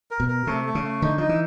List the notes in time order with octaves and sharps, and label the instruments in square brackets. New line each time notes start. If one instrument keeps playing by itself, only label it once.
[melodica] A#4
[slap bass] B2
[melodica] A#4
[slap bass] C3 [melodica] A3
[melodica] A3
[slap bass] C#3
[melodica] A3
[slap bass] D3 [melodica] D#4
[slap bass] F3 [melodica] D#4
[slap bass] E3